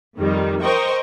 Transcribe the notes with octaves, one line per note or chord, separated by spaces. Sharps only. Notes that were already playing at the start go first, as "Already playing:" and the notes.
F2 D#3 G3
A#4 C5 D#5 G5 C#6